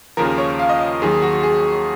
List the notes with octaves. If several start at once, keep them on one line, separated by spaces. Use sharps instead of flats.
D#2 C#3 F3 A#4
C#5
F5
D#5
D#2 D#3 F#3 G#4
F#4
G#4